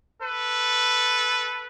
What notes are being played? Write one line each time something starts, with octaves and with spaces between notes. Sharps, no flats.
A4 B4